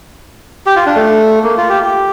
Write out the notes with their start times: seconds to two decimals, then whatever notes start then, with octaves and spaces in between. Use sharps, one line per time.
0.66 G4
0.76 F4
0.86 D4
0.95 A3
1.43 A#3
1.57 F4
1.70 G4
1.83 G4